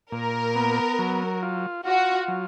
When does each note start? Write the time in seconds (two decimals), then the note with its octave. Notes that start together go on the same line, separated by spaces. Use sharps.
0.12 A#2 A#4
0.56 B3
0.99 F#3
1.42 F4
1.85 F4 F#4
2.28 F#3